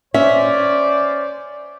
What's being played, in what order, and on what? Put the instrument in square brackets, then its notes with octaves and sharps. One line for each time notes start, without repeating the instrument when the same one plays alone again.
[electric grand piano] C#4 [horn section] C5 D5 [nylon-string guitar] E5